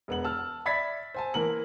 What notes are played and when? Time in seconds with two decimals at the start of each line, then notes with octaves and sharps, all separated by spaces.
0.08 E1 B3 F#7
0.24 A5 E6 F6
0.66 D5 E5 B5 G#6 A6 B6
1.14 C5 G#5 A5
1.34 E3 A#3 A#4 F#7